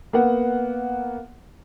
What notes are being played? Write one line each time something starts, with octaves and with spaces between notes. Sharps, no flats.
A#3 B3 F#5